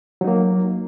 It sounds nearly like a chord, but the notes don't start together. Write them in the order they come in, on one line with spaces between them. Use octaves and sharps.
F#3 D#4 A#3